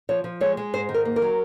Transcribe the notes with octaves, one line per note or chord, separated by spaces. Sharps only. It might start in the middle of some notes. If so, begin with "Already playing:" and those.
F3 C#5
F3
G#3 C#5
G#3
G#2 C5
D#3
A#4
A#3
A#4
F#3